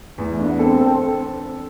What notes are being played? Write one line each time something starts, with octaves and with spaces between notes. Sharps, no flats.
E2 A3
A3
D4
B3
C4 A4
A4